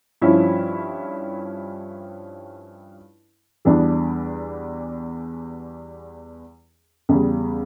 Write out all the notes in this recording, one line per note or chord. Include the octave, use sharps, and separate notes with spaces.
G2 F3 C#4 E4
E2 E3 G3 D4
E2 C#3 G3